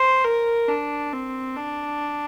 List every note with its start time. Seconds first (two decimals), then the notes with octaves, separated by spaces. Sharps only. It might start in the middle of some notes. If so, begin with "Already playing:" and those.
Already playing: C5
0.24 A#4
0.68 D4
1.12 C4
1.56 D4